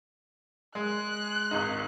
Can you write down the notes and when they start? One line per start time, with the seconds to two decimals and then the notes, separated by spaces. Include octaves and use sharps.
0.75 G#3 F#6
1.51 G#1 C#2 D#4